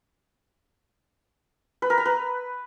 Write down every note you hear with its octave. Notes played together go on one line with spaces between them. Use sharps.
B4
A#4
A#5
B4